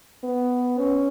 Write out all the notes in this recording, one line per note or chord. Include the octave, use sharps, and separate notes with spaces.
B3
C#4